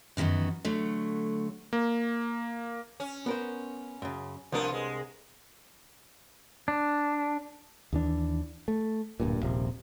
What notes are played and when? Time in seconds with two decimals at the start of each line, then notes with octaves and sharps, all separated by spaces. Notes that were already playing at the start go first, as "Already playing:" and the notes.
0.17 F#2 D#3 E3 B3 F#4
0.65 D3 F#3 A3
1.73 A#3
3.00 C#4
3.26 B3 A#4 C5
4.02 F#2 C#3
4.52 C2 C3 F3 B3 D4 A#4
4.73 G#3
6.68 D4
7.93 D#2 E3 D4
8.68 A3
9.20 D1 G2 A#2
9.41 D#1 A#1 C3